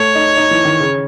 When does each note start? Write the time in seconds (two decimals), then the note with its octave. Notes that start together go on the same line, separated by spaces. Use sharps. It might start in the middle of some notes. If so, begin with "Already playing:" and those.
Already playing: A3 C#5
0.15 D#4
0.37 D#4
0.51 E3
0.65 D#3
0.80 C#3